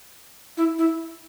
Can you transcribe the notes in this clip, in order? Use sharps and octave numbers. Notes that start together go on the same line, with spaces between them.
E4
E4